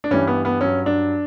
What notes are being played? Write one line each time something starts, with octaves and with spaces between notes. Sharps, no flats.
D4
G2 E3 G3 C#4
B3
B3
G2 F#3 C#4
D4